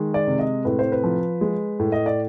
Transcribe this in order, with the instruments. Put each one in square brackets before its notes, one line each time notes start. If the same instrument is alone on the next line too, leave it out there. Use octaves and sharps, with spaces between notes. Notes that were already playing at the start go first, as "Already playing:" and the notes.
Already playing: [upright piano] D#3 G#3
D5
C3
D#5
A2 B4
C5
B4
F3
G#3
A2
D#5
D5